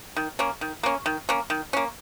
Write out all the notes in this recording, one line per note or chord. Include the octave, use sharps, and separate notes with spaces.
D#3
A#3 C#4
D#3
A#3 C#4
D#3
A#3 C#4
D#3
A#3 C#4